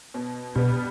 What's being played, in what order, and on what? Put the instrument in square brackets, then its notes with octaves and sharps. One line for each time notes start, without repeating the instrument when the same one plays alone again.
[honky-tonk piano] B2
[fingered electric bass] B2 [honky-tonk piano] G3 B3